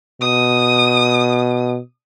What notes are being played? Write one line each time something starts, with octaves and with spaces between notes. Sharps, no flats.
B2 D#6